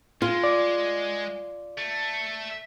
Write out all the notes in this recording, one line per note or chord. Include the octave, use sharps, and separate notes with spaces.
G#3 F4
D5
A3